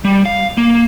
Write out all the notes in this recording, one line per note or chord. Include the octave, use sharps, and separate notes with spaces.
G3
F5
A#3